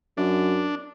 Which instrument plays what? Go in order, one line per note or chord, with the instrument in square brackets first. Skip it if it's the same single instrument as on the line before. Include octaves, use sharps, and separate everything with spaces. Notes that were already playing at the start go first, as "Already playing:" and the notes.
[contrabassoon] F#2 [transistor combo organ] D4